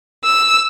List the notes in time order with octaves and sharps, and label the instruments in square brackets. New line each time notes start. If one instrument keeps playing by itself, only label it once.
[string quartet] E6